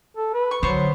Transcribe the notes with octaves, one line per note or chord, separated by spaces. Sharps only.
A4
B4
C#6
D3 F#3 B3 C5 C#6